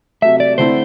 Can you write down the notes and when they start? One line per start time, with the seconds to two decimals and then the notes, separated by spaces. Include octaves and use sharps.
0.22 C3 F#3 A3 E5
0.40 D5
0.58 D3 A3 C4 E4 C5